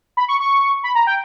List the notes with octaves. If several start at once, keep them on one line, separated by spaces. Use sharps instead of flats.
B5
C#6
C#6
B5
A#5
G5